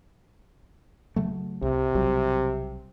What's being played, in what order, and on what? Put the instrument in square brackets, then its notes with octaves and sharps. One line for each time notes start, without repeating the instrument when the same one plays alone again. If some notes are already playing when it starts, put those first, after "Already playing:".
[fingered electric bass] C#3 F#3 A3
[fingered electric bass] C2 [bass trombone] C3
[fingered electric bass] B1 F#3 G3